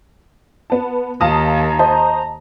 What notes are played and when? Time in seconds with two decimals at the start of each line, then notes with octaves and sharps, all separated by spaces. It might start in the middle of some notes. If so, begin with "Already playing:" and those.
0.70 B3 A5
1.21 D#2 F5 A5 A#5 D#6
1.79 C5 D#5 A5